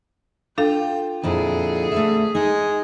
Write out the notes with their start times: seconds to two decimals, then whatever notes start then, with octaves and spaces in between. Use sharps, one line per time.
0.58 D4 F4 A4 F5 G5
1.23 F2 A#2 D3 E4 G#4
1.92 A3 B4 E5
2.35 G#3 D#4